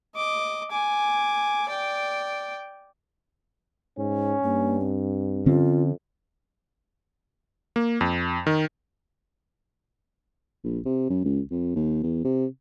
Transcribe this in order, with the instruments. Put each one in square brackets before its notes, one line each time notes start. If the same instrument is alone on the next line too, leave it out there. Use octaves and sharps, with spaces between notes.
[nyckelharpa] D#5 D6
G#5 D6
D5 G5
[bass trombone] G#2 [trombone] C#4
[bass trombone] G2 [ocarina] A#3
[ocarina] C4
[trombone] F2 [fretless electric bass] D3 C4 C#4 [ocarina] F4
[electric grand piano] A#3
F2
D#3
[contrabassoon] A#1
C3
F#2
C#2
F2
D#2
E2
C3